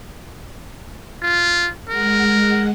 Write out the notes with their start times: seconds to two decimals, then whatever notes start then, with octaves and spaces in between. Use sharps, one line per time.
1.22 F4
1.89 G#3 A#4 F#5